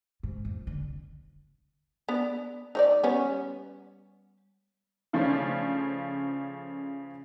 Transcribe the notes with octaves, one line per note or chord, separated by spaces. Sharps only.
G#2
F2
D3
B3 D4
D#4 C#5 D5
G3 B3 C#4
C#3 F3 A3 C#4 D4